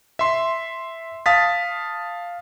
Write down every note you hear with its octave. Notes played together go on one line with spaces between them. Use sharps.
E5 C6
F5 A5 D#6 A6 B6